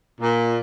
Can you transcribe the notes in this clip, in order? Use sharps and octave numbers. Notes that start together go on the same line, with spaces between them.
A#2